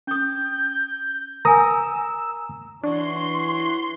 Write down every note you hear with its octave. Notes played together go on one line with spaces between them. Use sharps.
C#4 D#6 G6
A#4 G#5 A#5 D#6 E6
E3 D4 F#4 C#5 C6